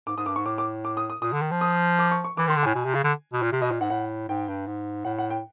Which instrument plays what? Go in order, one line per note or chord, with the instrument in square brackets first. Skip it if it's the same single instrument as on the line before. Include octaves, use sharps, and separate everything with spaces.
[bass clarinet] G#2 [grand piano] D6
[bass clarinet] G#2 [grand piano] D#6
[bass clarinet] G2 [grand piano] D6
[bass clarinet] G#2 [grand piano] C#6
[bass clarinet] A2 [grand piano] D6
[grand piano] D6
D6
D#6
D#6
[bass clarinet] A#2 [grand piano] D#6
[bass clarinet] D3
D#3
F3
[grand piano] D#6
D6
C#6
C#6
[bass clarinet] E3 [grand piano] D6
[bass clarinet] D#3 [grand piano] C6
[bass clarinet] D3
[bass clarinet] A2 [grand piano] G#5
[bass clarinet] B2
C3
C#3
D3
B2
A#2
C3
[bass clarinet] B2 [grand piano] D#5
[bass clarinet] A#2
[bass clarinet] G#2 [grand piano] F#5
[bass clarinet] A2 [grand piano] F#5
[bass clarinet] G#2 [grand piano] G5
[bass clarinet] G2
G#2
[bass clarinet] A2 [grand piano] F#5
[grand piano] F#5
G5